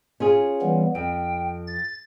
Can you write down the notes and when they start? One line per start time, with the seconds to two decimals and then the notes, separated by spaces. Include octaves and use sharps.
0.20 C#4 F4 G#4
0.62 E3 G3 B3
0.95 F2 G5
1.67 A6